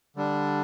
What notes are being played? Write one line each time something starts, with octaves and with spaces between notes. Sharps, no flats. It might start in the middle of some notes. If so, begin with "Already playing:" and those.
D3 G3 D4